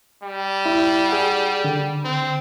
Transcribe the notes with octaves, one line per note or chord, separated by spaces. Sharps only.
G3
E4
G#4 F#5
D3
C4